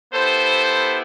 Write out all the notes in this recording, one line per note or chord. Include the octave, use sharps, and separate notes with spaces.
B3 E4 G4 A4 C5